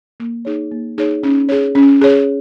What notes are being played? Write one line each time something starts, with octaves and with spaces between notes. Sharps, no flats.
A#3
D#4 G#4 C#5
A#3
D#4 G#4 C#5
C#4
G#4 C#5
C#4
G#4 C#5